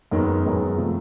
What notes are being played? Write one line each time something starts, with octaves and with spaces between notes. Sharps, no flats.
F#2 D#3 G#3 B3
F#2 D#3 G#3 B3
C3 F3 A3